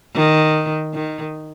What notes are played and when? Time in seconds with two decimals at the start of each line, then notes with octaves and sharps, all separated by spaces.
0.15 D#3
0.94 D#3